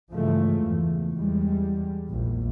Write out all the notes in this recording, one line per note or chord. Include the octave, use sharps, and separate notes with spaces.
G2 C#3 E3 F3 G#3 A3
E2
E2 G3 G#3
A#1 E2